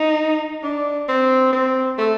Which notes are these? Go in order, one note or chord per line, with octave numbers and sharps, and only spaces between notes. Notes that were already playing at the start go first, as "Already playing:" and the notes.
Already playing: D#4
D4
C4
C4
A3